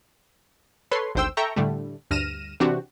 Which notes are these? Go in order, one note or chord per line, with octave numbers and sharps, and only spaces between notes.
A4 B4 C#5 C6
G#1 D2 C5 G5 E6
A4 E5 G5 A#5 C#6
A2 D3 G3 A3
D2 G2 F6 A#6 D#7 E7
C3 E3 C4 D4 F#4 G4